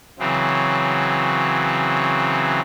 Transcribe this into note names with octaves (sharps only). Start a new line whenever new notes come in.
C#3 E3 F#3 C4